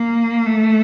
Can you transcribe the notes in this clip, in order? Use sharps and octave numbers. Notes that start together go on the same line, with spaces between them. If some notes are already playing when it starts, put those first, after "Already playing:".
Already playing: A#3
A3